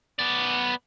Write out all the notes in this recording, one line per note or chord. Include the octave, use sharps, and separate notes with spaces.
B3 D5